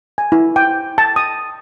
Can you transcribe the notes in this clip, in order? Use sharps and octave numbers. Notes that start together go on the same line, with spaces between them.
G#5
E4
G5
A5
D#6